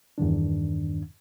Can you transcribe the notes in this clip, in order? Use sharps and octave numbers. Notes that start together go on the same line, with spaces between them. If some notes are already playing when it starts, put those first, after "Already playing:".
E2 G2 D#3 D4